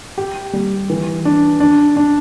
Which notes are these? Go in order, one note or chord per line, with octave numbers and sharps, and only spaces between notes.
G4
G3
E3
D4
D4
D4